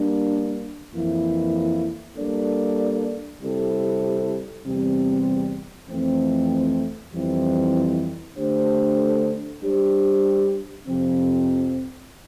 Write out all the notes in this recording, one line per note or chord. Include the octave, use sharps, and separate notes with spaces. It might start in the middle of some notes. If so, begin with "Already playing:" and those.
Already playing: G3 A#3 D4
F2 E3 A#3 E4
G3 A#3 D4 A4 D5
C3 G3 C4 E4 A4
E2 C3 G3 C4
F2 E3 A3 C4
F2 E3 G3 C4 E4
D3 A3 D4 G4 C5
G3 D4 G4 C5
F2 C3 F3 C4